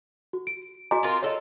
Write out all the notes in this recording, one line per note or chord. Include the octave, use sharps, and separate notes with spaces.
F#4
D7
F#4 D#5 G#5 A#5 D6
C4 F4 A#4
F4 A4 C#5 D#5